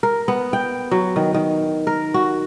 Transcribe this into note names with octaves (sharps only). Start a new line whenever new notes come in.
A#4
B3
G5
F#3
D#3
D#3
A#4
F#4